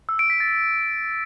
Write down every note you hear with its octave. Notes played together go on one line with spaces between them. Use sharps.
E6
D7
B6
A6